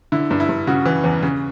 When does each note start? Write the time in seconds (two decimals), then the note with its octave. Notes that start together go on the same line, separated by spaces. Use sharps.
0.12 D3 E4
0.31 G2
0.40 E4
0.49 G2
0.67 C#3 F#4
0.86 E3
1.04 E2
1.22 C#3